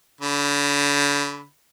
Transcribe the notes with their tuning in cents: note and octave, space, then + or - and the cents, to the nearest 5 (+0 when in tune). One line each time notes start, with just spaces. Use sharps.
D3 -40 B5 +0